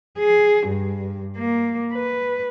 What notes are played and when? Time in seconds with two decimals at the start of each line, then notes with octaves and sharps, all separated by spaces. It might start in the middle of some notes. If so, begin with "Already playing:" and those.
0.19 G#4
0.67 G2
1.37 A#3
1.93 B4